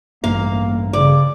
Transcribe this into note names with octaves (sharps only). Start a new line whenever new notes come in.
A1 G2 A3 A#3 F5
C#3 D5